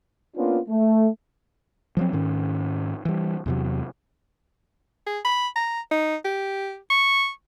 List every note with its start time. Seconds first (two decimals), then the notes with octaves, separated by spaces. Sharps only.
0.37 A#3 B3 C#4 D4 F4
0.69 A3
1.97 F3 F#3 C4
2.13 G#2 D#3 C#4
3.05 E3 G3
3.46 E2 C3 F#3
5.06 G#4
5.25 B5
5.56 A#5
5.92 D#4
6.25 G4
6.90 C#6